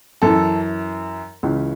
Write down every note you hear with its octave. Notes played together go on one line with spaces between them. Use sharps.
F#2 E3 A4
C#2 C#3 E3